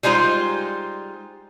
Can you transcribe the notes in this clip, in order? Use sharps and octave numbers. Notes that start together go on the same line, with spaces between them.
G3 G#3 D#4 F4 C5